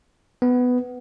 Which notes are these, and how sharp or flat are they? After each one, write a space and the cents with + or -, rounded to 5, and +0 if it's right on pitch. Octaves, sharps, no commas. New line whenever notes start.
B3 +10